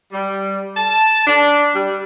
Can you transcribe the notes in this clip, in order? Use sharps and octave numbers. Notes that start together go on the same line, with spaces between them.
G3
A5
D4
G3